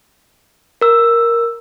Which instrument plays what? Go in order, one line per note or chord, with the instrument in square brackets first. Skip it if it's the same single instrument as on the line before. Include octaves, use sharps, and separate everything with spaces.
[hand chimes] A#4 E6